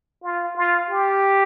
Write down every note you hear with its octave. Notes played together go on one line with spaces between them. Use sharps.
F4
F4
G4